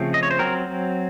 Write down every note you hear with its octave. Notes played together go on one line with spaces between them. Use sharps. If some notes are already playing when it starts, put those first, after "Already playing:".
Already playing: C#3 F3 A3 C4
D#5
C#5
C5
F#3 C4 A#4